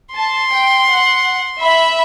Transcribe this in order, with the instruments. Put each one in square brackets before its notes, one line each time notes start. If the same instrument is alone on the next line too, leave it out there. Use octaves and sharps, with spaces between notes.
[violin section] A5 [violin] C6
[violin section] G5
F#5
[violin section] E5 [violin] B5